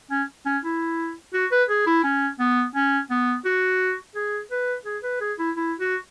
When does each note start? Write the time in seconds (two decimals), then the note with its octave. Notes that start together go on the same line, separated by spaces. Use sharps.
0.11 C#4
0.46 C#4
0.63 E4
1.33 F#4
1.51 B4
1.69 G#4
1.86 E4
2.04 C#4
2.39 B3
2.75 C#4
3.10 B3
3.45 F#4
4.15 G#4
4.51 B4
4.85 G#4
5.03 B4
5.20 G#4
5.38 E4
5.56 E4
5.79 F#4